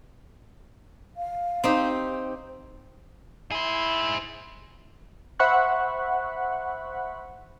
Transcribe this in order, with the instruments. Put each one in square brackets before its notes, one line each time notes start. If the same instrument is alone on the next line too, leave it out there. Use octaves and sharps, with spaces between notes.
[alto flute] F5
[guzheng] C4 D#4 G4
[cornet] E4 [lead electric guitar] G#4 C5
[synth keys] C5 E5 F#5 B5 C#6 F#6